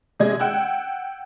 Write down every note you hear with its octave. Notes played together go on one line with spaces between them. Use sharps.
C3 G#3 D#5 G#6
F#5 G5 E6 F#6